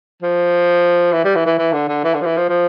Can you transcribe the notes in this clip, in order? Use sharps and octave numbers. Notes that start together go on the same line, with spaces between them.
F3
E3
G3
E3
E3
E3
D3
D3
E3
D3
F3
E3
F3
F3